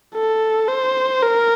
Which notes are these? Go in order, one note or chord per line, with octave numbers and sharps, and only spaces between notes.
A4
C5
A#4